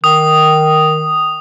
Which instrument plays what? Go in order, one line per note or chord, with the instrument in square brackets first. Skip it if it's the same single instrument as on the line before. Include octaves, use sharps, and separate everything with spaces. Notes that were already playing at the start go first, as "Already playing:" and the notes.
[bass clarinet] D#3 [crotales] D#6